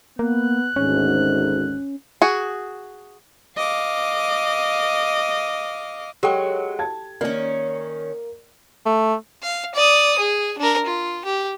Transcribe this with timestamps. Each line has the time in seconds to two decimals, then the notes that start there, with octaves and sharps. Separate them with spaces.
0.19 A#3 B3 F#6
0.76 G#1 D2 G#2 C#4
2.22 F#4 G#4
3.57 D#5 F5 D6
6.23 F#3 G#3 G4 A4 G5
6.79 A5 G#6
7.21 D#3 A#3 C#4 D5
8.86 A3
9.43 F5
9.75 D5 D#6
10.19 G#4
10.58 D4 A#4
10.86 F4
11.25 G4